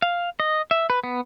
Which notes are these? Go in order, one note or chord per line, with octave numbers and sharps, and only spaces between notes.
F5
D#5
E5
B4
B3